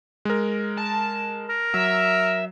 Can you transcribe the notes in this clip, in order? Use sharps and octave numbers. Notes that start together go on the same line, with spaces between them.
G#3 A#4
A5
A#4
F#3 E5